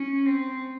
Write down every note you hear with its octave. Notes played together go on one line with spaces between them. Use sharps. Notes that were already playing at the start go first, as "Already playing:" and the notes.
Already playing: C#4
C4